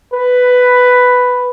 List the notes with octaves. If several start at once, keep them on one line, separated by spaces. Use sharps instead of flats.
B4